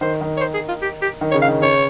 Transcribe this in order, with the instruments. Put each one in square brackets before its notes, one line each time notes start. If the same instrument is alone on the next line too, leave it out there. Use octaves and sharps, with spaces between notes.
[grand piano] D#3 [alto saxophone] C5
[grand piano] D#3
[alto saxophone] C#5
C5
G#4
F4
G4
G4
[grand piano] D#3
[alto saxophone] C#5
[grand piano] C#3
[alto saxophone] F5
[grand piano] D#3
[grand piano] C#3 [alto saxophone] C#5